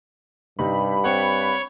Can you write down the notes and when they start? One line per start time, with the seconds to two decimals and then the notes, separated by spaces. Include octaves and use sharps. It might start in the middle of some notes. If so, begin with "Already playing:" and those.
0.59 G2 C3 D#4 B5
1.04 C4 C#5 F#5